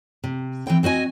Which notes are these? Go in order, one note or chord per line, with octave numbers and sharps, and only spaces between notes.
C3
E3 C4 G5
C4 F#4 D#5 G#5